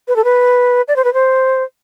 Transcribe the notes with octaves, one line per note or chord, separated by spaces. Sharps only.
B4
A4
B4
D5
C5
B4
C5